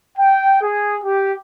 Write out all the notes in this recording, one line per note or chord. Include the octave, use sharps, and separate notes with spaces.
G5
G#4
G4